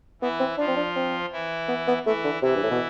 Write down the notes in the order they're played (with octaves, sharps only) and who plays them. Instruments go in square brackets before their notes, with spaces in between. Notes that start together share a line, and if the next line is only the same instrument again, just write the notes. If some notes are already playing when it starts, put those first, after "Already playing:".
[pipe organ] E3 E4 [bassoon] B3
[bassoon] C4
[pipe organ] F3 F4 [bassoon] D4
[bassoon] C4
D4
C4
[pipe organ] E3 E4
[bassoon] B3
B3
[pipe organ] E3 E4 [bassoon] A3
[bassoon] D3
[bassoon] C3 [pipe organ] E3 E4
[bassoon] G2
A2
B2